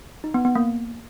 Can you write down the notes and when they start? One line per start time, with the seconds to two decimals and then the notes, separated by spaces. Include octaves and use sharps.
0.24 D#4
0.34 B3
0.45 B3
0.55 A#3